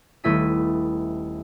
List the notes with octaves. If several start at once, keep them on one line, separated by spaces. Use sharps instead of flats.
D#1 A3 B3 E4 B6 D#7